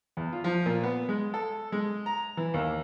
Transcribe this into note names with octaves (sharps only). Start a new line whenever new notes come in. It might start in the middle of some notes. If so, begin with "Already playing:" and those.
E2
F4
F3
A#2
B3
G#3
A4
G#3
A#5
E3
D#2